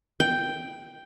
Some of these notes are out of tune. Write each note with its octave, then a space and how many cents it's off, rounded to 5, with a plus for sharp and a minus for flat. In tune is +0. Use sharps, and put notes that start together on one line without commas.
G5 +0